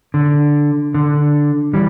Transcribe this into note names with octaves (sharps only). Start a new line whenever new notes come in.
D3
D3
E3 G3